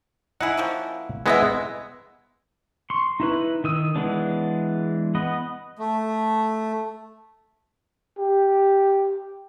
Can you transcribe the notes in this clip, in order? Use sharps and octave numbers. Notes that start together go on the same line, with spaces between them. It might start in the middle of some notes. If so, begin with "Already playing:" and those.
D#4 E4 G#4 F#5
F3 A#3 C#4
C3 G#3 B3 E4 D#5 E5
C6 C#6
D#4 E4 B4
D#3 D#6 E6
E3 G#3 B3 D4
B3 B4 D#5
A3
G4